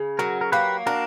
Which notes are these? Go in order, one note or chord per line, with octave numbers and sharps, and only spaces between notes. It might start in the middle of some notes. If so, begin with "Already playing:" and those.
Already playing: C#3
F#3 F#4 A#4
A#4
A#3 G4 B4
D4 F#4 A#4